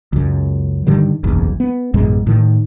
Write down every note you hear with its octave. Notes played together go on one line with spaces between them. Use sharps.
C#2 F#2
G2 D3 D#3 G3
F#1 B1 E2
B3
A1 F#2 B2 G#3
A2 D#3